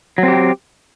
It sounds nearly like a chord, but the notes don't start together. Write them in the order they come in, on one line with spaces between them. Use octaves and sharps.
F#3 C4 G4